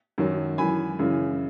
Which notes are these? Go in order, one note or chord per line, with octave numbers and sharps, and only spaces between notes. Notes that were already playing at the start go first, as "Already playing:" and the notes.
F#2 D#3 F#3
F#2 E3 G#5 B5
F#2 C#3 E3